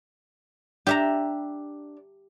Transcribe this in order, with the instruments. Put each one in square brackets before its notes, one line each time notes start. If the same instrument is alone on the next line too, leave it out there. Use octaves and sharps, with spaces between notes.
[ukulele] D4 [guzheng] G4 E5 A#5